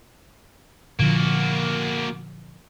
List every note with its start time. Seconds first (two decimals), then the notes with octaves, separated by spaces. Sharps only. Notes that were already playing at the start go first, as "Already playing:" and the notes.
0.99 A#2 D3 F3 A#3 F#4